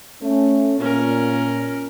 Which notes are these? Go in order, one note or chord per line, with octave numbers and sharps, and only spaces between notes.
A3 C#4
A#2 C#4 A#4